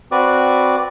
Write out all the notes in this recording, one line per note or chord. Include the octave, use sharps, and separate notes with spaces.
C4 F#4 B4 D5 D6